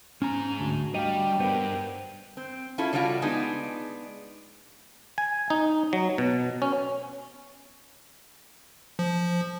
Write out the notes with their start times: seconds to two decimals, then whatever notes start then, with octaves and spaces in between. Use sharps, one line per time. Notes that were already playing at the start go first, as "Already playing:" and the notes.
0.22 G#2 C#4 G#5 A#5
0.60 D2 D4 F#4
0.94 G3 G4 D#5 F5
1.40 G2 B3 A#4 C5
2.37 C4
2.78 C#4 E4 F4 G#4 A4
2.93 C#3 G3 D4 F4 F#4
3.22 G#3 B3 D4 D#4 G#4
5.18 G#5
5.50 D#4
5.93 F#3
6.18 B2
6.62 C#4
8.99 F3